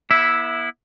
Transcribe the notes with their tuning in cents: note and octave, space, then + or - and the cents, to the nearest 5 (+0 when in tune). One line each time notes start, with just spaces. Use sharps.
B3 -35 E4 +0 E5 -5